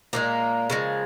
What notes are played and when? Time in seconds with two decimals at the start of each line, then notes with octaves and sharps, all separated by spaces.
0.13 A#2 F3 G#3 A#3
0.70 C#3 F3 G#3